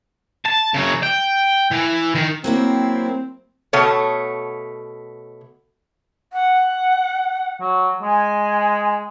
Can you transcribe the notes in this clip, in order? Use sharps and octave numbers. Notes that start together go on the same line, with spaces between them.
A5
C#3 F#3
G5
E3
D#3
F#3 A#3 C4 E4
B2 A3 C#5
F#5
F#3
G#3 G#5